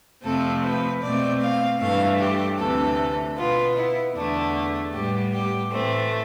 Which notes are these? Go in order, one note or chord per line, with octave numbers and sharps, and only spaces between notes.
F2 C3 F3 A3 C4 A4
B4
B2 A3 C4 D5
F5
G2 E3 A3 F5
G4
D2 C3 E3 A4
B2 B3 F4
E4
E2 D3 A3 D4
A2 G3 B3 G4
G4
A2 E3 A3 C4